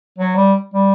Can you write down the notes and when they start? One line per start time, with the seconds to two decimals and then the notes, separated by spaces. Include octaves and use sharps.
0.19 F#3
0.36 G3
0.74 G3